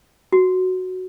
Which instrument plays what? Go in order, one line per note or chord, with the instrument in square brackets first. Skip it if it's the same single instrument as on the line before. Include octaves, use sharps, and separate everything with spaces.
[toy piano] F#4